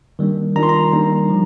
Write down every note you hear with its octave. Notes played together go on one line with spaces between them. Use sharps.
D#3 G3 A#3 D4
D#3 G3 D4 F4 A#5
C6
A#5
D#3 G3 A#3 D#4
F3